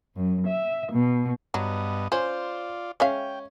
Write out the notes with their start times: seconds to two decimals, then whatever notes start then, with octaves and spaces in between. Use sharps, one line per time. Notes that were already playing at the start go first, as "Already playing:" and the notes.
0.15 F#2
0.47 E5
0.92 B2
1.54 G2 F#3 B3 D#5
2.12 C#4 F4 C5 D5
3.00 G#3 C#4 E5 F5 G5